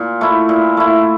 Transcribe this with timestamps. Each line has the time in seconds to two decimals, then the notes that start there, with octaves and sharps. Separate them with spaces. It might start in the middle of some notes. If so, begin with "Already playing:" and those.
Already playing: A#2
0.21 A3 E4
0.49 A#2
0.77 A3 E4